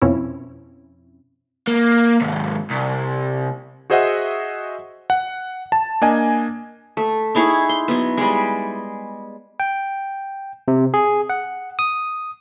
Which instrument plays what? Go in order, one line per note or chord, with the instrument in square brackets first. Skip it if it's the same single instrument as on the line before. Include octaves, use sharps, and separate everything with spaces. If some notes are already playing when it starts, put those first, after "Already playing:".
[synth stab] F2 B2 F3 C4 C#4 E4
[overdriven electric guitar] A#3
D#2 G#2
C2
[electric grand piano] F#4 G#4 C5 D#5 E5 F#5
F#5
A5
A#3 D4 D#5 G#5
[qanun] A3
D#4 E4 G#4 C#5
C6
F#3 B3
G3 G#3
[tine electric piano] G5
C3
G#4
F#5
D#6